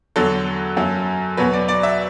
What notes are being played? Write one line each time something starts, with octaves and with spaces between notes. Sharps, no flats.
E2 D3 F#3 A4
F#2 F#3
E2 B2 F#3 B4
D5
D5
E5